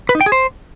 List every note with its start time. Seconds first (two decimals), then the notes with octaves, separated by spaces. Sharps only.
0.09 B4
0.15 D#4
0.21 G5
0.26 G#4
0.32 C5